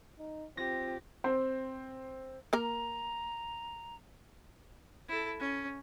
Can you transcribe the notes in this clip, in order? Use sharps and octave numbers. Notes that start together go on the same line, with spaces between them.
D#4
C4 F4 G4 A#6
C4 C5
A#3 A#4 A#5
E4 A4
C#4